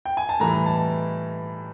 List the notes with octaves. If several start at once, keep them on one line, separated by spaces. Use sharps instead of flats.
G5
G#5
A5
A2 E3 G3 A#5
A5